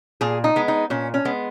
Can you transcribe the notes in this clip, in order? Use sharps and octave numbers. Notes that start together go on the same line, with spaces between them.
A#2 G#4
D#4
G#3 B3
D#4
A#2 C#4
C#4
G#3 B3